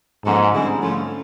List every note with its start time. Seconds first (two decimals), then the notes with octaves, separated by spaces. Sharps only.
0.25 G#2 F3 A#3 C#4 F#4 A4
0.53 D3 G3 C4 E4 G#4
0.81 F3 A3 C#4 F4